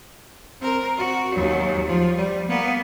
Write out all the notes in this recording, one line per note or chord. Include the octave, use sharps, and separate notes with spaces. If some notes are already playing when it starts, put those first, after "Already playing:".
C4 A#4
F#4
D#2 F#3
F3
G3
A#3 B3